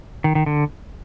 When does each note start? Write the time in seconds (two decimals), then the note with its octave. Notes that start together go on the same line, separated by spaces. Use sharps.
0.24 D#3
0.35 D#3
0.46 D3